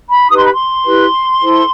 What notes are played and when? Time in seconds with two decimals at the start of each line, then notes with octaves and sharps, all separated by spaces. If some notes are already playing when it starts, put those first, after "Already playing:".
0.09 B5
0.28 D#4 G4 B4 D#6
0.37 C6
0.44 B5
0.53 C6
0.85 E4 G4 B4
1.41 E4 A4 C5